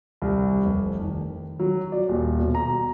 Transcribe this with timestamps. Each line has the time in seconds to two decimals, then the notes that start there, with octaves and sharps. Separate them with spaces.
0.22 C2
0.65 F1
1.01 D#3
1.59 F#3
1.92 D5
2.08 D#1
2.40 B2
2.55 A#5